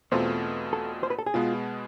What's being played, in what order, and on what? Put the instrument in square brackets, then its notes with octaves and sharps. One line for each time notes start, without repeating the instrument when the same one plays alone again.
[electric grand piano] E2 B2 A3 C4 F4 [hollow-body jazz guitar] C5
[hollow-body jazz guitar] A4
C5
B4
A4
G#4
[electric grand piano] B2 G#3 B3 [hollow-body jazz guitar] F4